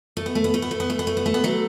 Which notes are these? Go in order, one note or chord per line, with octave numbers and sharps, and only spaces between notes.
A3
B3
A3
B3
A3
B3
A3
B3
A3
B3
A3
B3
A3
B3
F#3 A3